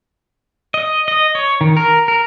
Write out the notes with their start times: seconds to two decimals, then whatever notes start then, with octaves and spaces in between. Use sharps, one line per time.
0.74 D#5
1.08 D#5
1.35 C#5
1.61 D#3
1.77 A#4
2.08 A#4